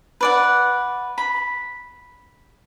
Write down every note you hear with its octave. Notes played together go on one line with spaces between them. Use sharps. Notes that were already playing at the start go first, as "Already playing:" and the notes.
B4 D5 F#5
B5